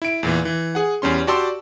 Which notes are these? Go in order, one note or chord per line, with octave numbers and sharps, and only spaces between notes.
E4 D7
E2 A#2 E3
E3
G#4 F#5
E2 G3 C#4 C6
F#4 G4 D5 A5 C6 E6